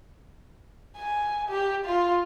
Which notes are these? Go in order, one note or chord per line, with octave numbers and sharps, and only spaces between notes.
G#5
G4
F4